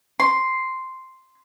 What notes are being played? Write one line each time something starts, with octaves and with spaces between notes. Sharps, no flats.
C6